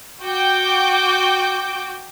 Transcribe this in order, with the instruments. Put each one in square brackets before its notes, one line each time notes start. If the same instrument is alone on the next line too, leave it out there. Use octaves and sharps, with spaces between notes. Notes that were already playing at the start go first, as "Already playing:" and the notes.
[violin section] F#4 G5 D6 G6